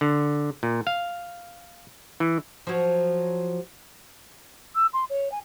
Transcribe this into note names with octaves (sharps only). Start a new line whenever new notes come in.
D3
A#2
F5
E3
F3 F#3
E6
C6
C#5
G#5